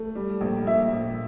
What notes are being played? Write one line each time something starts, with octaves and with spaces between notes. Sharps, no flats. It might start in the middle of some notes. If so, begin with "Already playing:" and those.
Already playing: A3
G3
A#1
A#2 E5
A#1